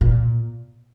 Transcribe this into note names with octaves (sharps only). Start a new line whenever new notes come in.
A#2